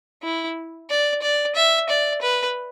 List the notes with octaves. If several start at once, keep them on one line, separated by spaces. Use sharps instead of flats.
E4
D5
D5
E5
D5
B4